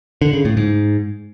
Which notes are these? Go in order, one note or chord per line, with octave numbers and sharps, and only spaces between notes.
D3
C#3
A2
G#2